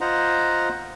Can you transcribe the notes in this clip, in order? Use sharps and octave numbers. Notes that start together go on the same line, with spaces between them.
F4 C5 D#5 F#5 A#5